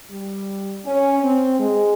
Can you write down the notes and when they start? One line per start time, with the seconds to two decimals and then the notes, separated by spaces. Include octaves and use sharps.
0.10 G3
0.85 C#4
1.22 C4
1.59 G#3